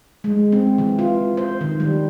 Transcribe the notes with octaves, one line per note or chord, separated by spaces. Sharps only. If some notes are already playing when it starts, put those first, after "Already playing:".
G#3
C4
E3
F4
C5
D#3
G3